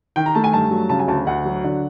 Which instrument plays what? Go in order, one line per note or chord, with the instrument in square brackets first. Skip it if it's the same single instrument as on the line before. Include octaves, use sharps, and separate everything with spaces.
[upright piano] D#3 G5
A#5
A3 A5
G#5
G2 A5
F#3
C#3 A5
G#5
D2 A5
D2 F#5
F#3
D3